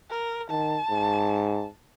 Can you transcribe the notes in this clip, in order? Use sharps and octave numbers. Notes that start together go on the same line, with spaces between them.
A#4
D#3 A5
G#2